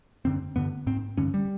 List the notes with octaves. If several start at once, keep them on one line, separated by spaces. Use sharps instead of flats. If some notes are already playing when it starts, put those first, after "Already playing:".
F#2 D3 C4
G2 D3 B3
G#2 C4
G2 D3 C#4
G3